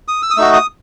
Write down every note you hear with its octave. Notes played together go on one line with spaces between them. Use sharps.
D#6
E6
D#6
A3 D#4 F#4 E6
D#6